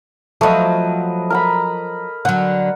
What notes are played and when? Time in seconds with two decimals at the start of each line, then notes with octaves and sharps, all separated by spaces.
0.41 F3 F#3 A3 B4 D#5
1.30 A#4 A#5 B5
2.25 D3 F#3 F#5